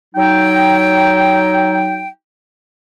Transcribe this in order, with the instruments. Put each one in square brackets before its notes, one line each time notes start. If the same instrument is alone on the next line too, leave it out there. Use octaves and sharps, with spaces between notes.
[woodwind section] F#3 D#4 G5